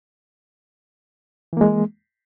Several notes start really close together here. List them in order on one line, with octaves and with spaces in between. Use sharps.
E3 A#3 G#3